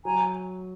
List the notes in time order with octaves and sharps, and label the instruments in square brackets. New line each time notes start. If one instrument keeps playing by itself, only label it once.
[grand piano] F#3 [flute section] G#5 A#5